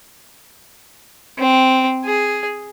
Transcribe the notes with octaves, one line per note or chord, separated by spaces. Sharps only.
C4
G#4